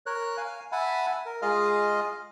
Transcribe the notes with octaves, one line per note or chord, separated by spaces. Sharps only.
A#4 C#5 F#6
F5 G#5
E5 F#5 G#5 A5 B5
A#4
G#3 F4 G#4 D#5 F5 F6